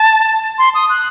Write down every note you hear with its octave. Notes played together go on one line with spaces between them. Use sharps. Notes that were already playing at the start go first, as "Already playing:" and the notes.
Already playing: A5
C6
D#6
F#6